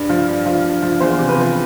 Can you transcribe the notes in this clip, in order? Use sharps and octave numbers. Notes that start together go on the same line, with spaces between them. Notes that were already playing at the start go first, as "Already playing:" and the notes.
Already playing: G2
F3
G2
F3
G2
F3
E2 C5
C3
B4
F3